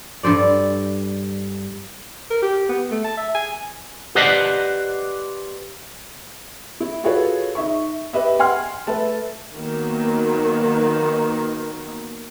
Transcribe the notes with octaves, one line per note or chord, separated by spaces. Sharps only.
G2 A4 C5 D5
A#4
G4
B3
A3
A5
E5
G#5
G4 B4 C5 D5 D#5 F#5
E4
F4 F#4 G#4 A4 B4 C#5
D#4 E5 C#6
G4 B4 D#5 E5
F#5 G#5 C6 F6
A3 A4 B4 E5 A5
D#3 F#3 A#3 B3